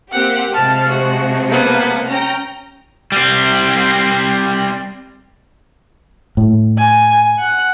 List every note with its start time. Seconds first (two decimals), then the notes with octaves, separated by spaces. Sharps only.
0.12 A#3 C4 G4 F#5
0.53 C3 F3 G#3 A5 F6
0.88 F#4
1.48 A#3 B3
2.07 C#4 G5 A#5
3.12 G3 C4
6.37 A2
6.78 G#5
7.39 F#5